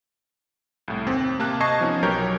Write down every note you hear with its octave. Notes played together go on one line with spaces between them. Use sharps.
C2 A2
D#2 C4
C3 A#3 A5 F#6
D#5 A5 C#6 G#6 C7
F3 B3 C#4 D#4
B1 F#3 G4 A#4 C#5 G6